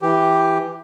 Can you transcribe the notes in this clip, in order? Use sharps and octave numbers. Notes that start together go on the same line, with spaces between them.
E3 G4